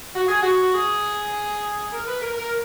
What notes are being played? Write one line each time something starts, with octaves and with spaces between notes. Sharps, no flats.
F#4
G#4
F#4
G#4
A#4
B4
A#4
A#4